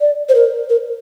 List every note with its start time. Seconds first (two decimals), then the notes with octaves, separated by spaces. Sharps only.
0.01 D5
0.29 C5
0.35 A#4
0.69 A#4